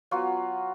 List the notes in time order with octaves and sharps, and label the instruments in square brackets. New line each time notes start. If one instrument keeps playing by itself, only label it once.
[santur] F#3 B3 F4 F#4